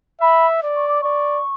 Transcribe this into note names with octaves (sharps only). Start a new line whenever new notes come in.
E5 B5
D5
C#6
D6
D5 C#6